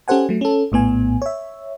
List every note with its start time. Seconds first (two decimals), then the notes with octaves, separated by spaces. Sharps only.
0.08 C#4 G4 A4 C5 F#5 G#5
0.29 F#3 A3
0.41 C#4 A4
0.72 A#1 A2 B3 G#5
1.22 C#5 E5